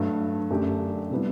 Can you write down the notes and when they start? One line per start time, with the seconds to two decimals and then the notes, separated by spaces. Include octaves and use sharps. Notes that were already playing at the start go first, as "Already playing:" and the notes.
Already playing: G2 F#3 A3
0.50 F#2 D3 A3 D4 G4
1.10 C3 G3 B3 E4